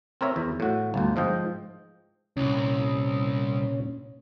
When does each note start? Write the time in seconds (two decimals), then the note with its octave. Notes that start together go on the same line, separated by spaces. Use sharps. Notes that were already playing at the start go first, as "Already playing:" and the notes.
0.21 C4 A#4 C#5 E5
0.36 E2
0.60 A2 F#4
0.94 G1 D2
1.16 G#2 F3 D#5 G5
2.37 C2 A#2 C#4